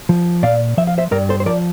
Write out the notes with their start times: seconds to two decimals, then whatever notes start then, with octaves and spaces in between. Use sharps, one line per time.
0.09 F3
0.43 A#2 D5 F5
0.77 F3 E5
0.87 F5
0.98 C5 E5
1.12 G2 A#4 D5
1.29 A4 C5
1.40 C5
1.46 F3 A#4 D5